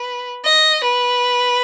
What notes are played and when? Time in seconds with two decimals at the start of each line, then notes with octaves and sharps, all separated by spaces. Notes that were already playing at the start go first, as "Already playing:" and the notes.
Already playing: B4
0.44 D#5
0.84 B4